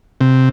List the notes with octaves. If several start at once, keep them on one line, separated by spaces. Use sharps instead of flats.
C3